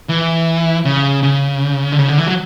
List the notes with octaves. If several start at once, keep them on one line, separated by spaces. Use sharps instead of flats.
E3
C#3
C#3
D3
C#3
D3
E3
F#3